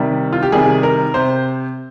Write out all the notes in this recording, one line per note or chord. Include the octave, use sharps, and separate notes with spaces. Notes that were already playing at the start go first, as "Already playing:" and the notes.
Already playing: C3 D#3 G3
F4
G4
C3 D#3 G3 G#4
A#4
C3 C5